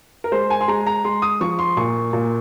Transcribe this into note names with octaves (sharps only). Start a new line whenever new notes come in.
A#4
G#3 C5
G#5
C6
G#3 A#5
A#5
G#3 C6
D#6
F3 C#6
C6
A#2 C#6
A#2